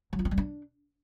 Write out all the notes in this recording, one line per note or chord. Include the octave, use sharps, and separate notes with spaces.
F#3
F4
C4
G3
D4